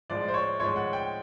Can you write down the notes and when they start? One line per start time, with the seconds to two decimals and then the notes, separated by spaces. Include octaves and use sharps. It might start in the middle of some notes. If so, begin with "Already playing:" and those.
0.10 A2 F3 G#3 D5
0.28 C5
0.34 C#5
0.60 A2 F3 G#3 C#5
0.76 F#5
0.93 G5